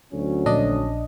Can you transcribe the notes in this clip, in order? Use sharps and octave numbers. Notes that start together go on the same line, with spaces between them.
D2 F#3 C#4
A#1 D4 D#5